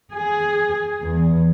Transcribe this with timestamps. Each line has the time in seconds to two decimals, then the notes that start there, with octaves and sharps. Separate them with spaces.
0.12 G#4
1.01 E2